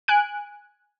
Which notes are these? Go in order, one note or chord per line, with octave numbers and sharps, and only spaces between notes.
G#5 F#6 D7